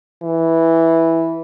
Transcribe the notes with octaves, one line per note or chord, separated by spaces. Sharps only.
E3